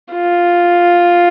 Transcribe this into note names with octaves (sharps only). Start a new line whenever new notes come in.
F4